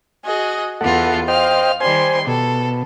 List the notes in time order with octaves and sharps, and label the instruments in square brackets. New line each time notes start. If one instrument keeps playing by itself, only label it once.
[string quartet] F#4 G#4 D#5
[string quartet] E2 B3 F4 [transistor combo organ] A4 F#5
[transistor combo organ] C5 D#5 G5 [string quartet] F5 F6
[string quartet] D#3 G3 C6 [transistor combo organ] C5 G#5
[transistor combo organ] B2 [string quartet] A4